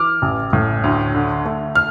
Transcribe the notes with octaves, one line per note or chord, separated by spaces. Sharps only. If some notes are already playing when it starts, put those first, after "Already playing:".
Already playing: E3 D6 F6
A1
A2
D2
D3
A3
F6